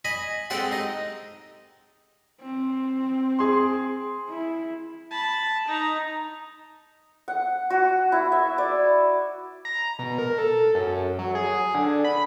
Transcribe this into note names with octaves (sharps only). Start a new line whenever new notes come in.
D#5 G#5 B5
G#3 C4 G4 A4 C5 F#5
D#4 D#5
C4
G#4 C6
E4
A5 B5
D#4 A#5
F#5
F#4
E4
E5
D5
A#5
B2
A#4
A4
F#2
F#3
G#4
D3
B5